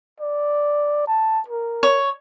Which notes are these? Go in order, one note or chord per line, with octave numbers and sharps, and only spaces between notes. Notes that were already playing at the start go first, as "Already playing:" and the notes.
D5
A5
A#4
C#5